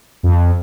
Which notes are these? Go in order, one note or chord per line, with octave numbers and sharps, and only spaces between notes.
F2